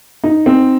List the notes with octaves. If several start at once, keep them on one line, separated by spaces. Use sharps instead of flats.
D#4
C4